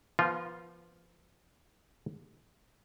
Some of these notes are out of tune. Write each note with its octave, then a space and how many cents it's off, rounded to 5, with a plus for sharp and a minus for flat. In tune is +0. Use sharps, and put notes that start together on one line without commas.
F3 -30 B3 -25 F4 +0